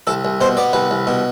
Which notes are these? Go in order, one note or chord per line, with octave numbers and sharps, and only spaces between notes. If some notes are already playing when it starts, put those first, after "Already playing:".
C2 A4
C2
B2 C5
B3 D5
C2 B4
C2
B2